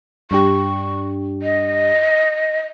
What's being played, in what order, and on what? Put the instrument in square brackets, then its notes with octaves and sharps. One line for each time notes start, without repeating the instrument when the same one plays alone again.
[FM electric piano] G2 D4 G4 [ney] C#6
[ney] D#5